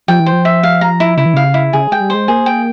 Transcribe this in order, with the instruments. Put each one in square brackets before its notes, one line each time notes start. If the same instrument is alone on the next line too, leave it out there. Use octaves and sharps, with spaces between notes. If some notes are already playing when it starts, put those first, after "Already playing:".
[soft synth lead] F3 [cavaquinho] G5
[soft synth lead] E3
[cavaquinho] C5
[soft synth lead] F3
[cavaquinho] E5
F5
A#5
E4
[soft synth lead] C#3 [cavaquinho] E4
[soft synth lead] E3
[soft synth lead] C#3 [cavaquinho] F5
[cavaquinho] E4
[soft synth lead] C#3 [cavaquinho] G#4
[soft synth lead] G#3 [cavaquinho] G5
[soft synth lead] G3
[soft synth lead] G#3 [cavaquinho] C5
[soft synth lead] A#3 [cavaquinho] G#4
[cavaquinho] G5